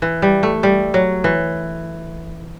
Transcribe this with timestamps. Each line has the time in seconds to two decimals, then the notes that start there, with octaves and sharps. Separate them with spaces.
0.02 E3
0.22 G3
0.43 A3
0.63 G3
0.94 F#3
1.24 E3